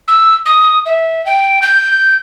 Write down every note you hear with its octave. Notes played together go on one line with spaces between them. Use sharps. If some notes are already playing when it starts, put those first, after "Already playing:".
E6
D#6
E5
G5
G6